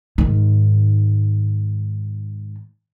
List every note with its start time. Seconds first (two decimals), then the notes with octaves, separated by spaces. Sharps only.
0.18 G#2 D#3